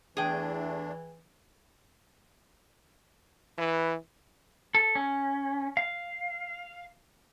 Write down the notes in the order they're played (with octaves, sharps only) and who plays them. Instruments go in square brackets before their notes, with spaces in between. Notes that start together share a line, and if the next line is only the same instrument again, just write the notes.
[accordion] E2 A3 D4 [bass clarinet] E3 [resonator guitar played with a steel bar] G#4 G5
[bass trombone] E3 [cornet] B4
[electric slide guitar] A4
C#4
F5